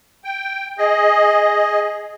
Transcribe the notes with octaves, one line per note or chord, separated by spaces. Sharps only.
G5
G#4 D#5